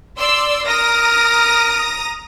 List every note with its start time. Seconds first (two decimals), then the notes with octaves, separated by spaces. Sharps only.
0.18 D5 C6 E6
0.67 A#4 A#5 D#6 A#6